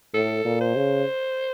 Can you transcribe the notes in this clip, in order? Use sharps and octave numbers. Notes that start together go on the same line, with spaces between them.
A2 A4
A#2
C5
C#3